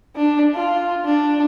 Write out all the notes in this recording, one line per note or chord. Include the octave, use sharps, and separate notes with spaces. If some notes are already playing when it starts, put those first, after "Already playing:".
D4
F4
D4